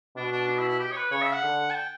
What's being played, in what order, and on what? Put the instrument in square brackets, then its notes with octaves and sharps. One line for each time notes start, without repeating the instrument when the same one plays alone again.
[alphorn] B2 [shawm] D4
[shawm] D4
D4
E4
E4
G4
C#5
B4
[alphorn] C#3 [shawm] C#5
[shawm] E5
F#5
[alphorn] D3
[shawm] A5
G5